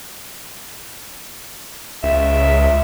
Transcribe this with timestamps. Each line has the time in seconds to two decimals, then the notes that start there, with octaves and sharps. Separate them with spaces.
2.04 C#2 E5